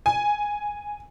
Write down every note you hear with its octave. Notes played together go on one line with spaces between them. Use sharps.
G#5